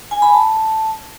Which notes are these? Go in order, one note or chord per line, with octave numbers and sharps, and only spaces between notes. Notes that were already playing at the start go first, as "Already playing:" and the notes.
G#5
B5
A5